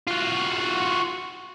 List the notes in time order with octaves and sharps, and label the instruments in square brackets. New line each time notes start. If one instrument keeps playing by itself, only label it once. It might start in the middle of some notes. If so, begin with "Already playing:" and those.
[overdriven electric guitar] F4 F#4